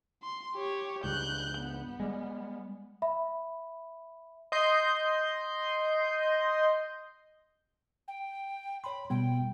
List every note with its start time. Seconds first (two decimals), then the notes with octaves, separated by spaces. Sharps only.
0.23 C6
0.56 G4 C#5
1.04 C#2 G2 F#6 G6
1.59 B3
2.00 G3 G#3
3.02 E5 B5
4.52 D#5 C6 G6
8.08 G5
8.84 C#5 B5 C6
9.10 B2 G3 B3 G5